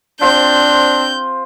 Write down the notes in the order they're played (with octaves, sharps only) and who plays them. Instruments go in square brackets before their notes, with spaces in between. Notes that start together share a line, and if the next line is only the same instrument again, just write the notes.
[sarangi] C4 [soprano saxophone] D4 [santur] F4 C5 [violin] G6